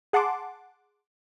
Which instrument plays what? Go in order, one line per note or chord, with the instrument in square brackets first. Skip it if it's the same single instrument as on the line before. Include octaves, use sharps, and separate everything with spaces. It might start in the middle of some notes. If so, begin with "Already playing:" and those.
[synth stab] G#4 F#5 A5 C6 D6